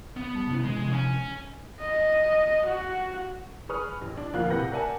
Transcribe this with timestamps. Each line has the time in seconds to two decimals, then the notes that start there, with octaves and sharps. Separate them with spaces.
0.17 B3
0.35 G3 A5
0.47 C3 C#4 E4
0.65 E3 G#3
0.78 C3 E3 F3
0.92 C#4 G#5
1.81 D#5
2.66 F#4
3.69 G#4 B4 C#6 D#6 F6
4.01 A1
4.17 D4
4.34 D2 F3 A#3 G4 F5 F#6
4.49 A2 C3 B4 F#5 G6 A#6
4.72 A#4 D5 E5 F#5 G#5 A5